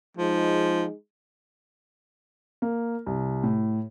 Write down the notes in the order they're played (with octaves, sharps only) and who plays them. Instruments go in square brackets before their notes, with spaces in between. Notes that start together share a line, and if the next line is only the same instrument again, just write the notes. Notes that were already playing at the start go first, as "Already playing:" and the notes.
[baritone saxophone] F3 [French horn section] G#3 D#4
[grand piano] A#3
C2
A2